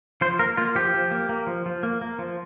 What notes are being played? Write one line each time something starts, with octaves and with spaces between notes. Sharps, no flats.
F3 C5
A#3 A#4
A#3 F4
F3 G4
F3
A#3
A#3
F3
F3
A#3
A#3
F3